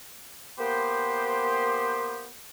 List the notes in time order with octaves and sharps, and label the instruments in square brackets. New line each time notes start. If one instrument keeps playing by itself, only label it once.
[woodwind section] A#3 B3 G4 C5